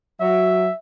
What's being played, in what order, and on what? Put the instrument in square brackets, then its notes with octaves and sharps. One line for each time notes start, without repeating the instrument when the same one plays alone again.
[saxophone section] F#3 [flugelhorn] E5